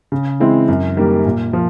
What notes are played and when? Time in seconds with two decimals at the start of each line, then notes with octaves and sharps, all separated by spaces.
0.12 C#3
0.40 E3 G#3 C4 E4
0.68 F#2
0.97 D#3 G3 A#3
1.25 A#2
1.53 F3